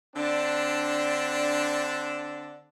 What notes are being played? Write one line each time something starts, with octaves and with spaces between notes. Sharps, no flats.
D3 C4 D4